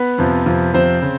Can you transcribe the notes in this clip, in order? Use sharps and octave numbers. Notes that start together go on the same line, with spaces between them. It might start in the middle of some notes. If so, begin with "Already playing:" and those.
Already playing: B3 B4
F2 C3 F3
F2 C3 F3
F2 C3 F3 C4 C5
C#3